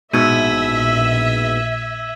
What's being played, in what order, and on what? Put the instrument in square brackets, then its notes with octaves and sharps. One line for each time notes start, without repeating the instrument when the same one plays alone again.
[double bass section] A#1 [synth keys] G#2 B2 [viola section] E5 [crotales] E6 G#6 D#7